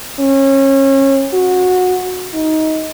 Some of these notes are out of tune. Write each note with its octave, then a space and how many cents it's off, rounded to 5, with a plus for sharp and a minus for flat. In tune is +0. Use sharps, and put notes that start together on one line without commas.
C#4 -30
F#4 -15
D#4 +15